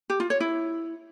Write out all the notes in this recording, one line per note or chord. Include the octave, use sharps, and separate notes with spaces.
G4
F4
C#5
E4